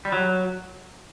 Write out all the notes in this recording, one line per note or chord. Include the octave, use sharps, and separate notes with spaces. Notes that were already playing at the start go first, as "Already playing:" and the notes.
G3
F#3